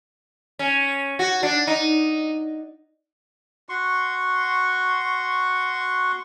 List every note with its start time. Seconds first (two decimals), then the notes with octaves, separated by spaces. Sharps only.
0.59 C#4
1.19 F#4
1.43 D4
1.67 D#4
3.69 F#4 C6 C#6